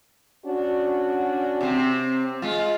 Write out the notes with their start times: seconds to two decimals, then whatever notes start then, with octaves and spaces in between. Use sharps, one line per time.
0.45 C#4 D4 F#4
1.61 C3 C4
2.42 G#3 F4